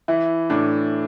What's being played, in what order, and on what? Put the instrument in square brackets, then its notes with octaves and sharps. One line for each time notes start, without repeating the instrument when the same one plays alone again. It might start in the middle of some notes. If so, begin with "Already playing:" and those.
[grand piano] E3 [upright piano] E4
[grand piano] A2 [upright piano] D4